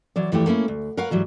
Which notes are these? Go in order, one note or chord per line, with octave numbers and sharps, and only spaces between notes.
E3 F#3 D5
E2 E3 F3 A3 E4 G4
A3 A#3 C#4 E4
D2
A#4 B4 C#5 F5 F#5
G#2 E3 F#3 G3